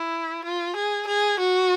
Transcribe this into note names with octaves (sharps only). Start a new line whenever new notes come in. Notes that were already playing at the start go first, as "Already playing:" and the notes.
Already playing: E4
F4
G#4
G#4
F#4